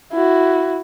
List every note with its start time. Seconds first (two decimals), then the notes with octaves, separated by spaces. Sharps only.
0.12 E4 F#4